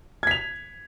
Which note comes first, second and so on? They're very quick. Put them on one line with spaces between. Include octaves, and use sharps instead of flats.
G#6 B6 F7